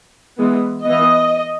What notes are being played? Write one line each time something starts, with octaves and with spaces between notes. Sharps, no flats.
E3 G#3 B3
E3 B3 D#5